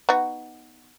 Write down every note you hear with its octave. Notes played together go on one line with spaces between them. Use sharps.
B3 D#4 F#4